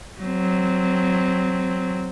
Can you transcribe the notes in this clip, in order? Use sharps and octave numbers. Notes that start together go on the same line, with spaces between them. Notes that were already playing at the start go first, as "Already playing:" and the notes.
F#3 C4